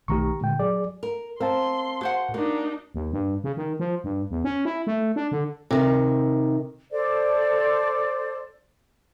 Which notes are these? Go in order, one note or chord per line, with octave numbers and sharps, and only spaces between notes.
B1 D#3 A3 G4 A#5 C#6
A#2 D3 G#3 G5
F#3 G#4 D5
A#4
C4 A#4 F5 A5 C6
F#4 G#4 C5 F#5
A#3 D4 D#4 F#4
D#2
G2
C#3
D#3
F3
G2
E2
C#4
E4
A3
D4
D3
C3 D#3
A4 C5 D5